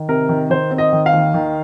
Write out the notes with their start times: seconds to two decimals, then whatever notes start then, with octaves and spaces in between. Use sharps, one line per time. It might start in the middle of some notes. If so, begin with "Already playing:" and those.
Already playing: D#3
0.09 C3 A#4
0.29 D#3
0.50 D#3 C5
0.71 C4
0.78 D#5
0.93 D#3
1.06 F5
1.13 D#2
1.34 D#3